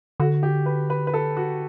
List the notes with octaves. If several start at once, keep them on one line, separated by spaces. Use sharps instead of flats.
D3 F#4
G4
B4
B4
B4
A4
F#4